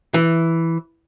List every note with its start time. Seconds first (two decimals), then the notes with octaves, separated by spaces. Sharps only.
0.14 E3